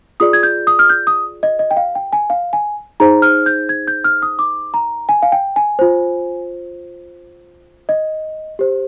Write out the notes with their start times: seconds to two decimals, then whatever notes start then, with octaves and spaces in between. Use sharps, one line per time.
0.20 F4 G#4 D5 D#6
0.33 G#6
0.43 G6
0.67 D#6
0.79 F6
0.90 G6
1.07 D#6
1.43 D#5
1.59 D#5
1.71 G5
1.77 F5
1.95 G5
2.13 G#5
2.30 F5
2.53 G#5
3.00 D#4 G#4 C5 A#5
3.22 F6
3.46 G6
3.69 G#6
3.88 G6
4.04 F6
4.22 D#6
4.39 D6
4.74 A#5
5.09 G#5
5.22 F5
5.32 G5
5.56 G#5
5.79 F4 C5
7.89 D#5
8.59 G4 C5